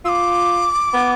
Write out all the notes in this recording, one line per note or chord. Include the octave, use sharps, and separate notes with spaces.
F4 D6 E6
B3